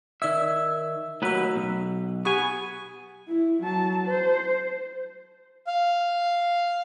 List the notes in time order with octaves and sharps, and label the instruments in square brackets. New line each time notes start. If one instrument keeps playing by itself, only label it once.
[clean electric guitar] D#3 E5 [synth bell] D5 E6 G#6
[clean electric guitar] D#2 F#3 B4 [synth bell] A3 F#4 E6
[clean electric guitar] B1
[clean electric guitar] B3 G#5 [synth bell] G4 C#6
[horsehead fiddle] E4
F#3 A5
C5
[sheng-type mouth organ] F5